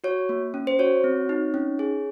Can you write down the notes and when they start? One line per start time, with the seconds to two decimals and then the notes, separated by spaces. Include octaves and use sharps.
0.04 F#4 C#5
0.29 A#3
0.54 C#4
0.67 C5
0.79 F#4 C#5
1.04 C4
1.29 D#4
1.54 C#4
1.79 G#4